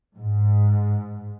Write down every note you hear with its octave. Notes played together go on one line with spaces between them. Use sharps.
G#2